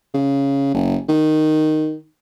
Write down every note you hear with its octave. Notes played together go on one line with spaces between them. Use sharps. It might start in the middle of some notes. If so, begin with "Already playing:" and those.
C#3
F#1
D#3